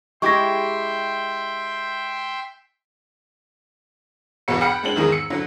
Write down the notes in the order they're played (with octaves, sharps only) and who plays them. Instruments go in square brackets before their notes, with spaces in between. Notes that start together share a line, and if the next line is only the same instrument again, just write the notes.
[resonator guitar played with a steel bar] G#3 E4 G4 [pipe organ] E5 G5 C6 [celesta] C#6 A#6
[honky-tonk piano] G1 E2 B2 F#4 C#5 C#7
F#5 G5 B5 F6 C#7
G#3 C4 D4 F#7
E2 G#2 D#3 D#4 G#4
E6 C#7
D3 F#3 C4